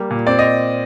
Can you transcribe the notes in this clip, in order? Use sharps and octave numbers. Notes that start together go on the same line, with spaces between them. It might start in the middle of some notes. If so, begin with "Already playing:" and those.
Already playing: G3 A#3
A#2
C4 D5
D#5